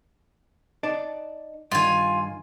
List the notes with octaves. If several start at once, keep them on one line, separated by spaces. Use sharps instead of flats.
D#4 D5 A5
G2 D#3 F4 G#5